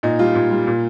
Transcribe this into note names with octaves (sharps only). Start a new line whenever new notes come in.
A#2 D#4
G3 F4
A#2
G3
A#2